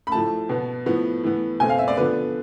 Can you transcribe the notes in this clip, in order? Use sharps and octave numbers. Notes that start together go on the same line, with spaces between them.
B5
A2 F3 A3 A5
B2 B3
A2 F3 B3
A2 E3 B3
B2 A3 C4 G#5
F5
E5
D5
D3 F3 B3 B4